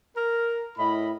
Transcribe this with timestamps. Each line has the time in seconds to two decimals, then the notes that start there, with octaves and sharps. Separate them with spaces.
0.16 A#4
0.78 A2 E4 D#5 B5